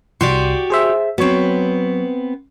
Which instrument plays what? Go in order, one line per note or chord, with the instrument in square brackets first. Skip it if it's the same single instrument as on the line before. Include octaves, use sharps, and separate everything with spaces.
[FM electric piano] C2 C6 [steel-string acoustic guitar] F#4 G4 D5
[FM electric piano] G#4 C5 E5
[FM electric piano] F#3 C#5 [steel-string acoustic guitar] B3 C4